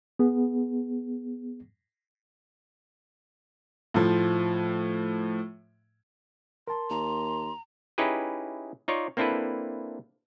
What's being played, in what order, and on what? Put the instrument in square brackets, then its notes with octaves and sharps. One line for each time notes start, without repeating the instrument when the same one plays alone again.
[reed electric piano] B3 G#4
[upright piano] A2 F3
[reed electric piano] A#4 A5 [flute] C6
[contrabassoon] D#2 [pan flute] A#5
[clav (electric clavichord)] C#4 D#4 E4 G4 G#4 B4
D#4 F4 C#5 D5
A#3 C4 D4 E4 A4 B4